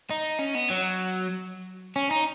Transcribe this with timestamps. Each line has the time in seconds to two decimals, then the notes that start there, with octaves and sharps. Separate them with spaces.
0.11 D#4
0.39 C#4
0.55 B3
0.70 F#3
1.96 C#4
2.11 D#4